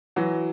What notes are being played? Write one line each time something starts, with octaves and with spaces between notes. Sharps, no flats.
E3 F#3